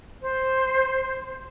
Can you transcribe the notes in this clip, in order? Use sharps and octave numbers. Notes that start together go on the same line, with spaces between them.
C5